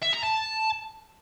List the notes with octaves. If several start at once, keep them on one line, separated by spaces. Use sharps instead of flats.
E5
A#5
A5